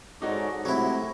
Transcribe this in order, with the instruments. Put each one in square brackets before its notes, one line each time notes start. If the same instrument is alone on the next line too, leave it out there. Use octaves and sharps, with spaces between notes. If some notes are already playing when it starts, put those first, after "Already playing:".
[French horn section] G#2 [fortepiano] D#4 F#4 [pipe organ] A4 C#5 D5
[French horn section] C3 [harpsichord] F#3 E4 [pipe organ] G#3 A3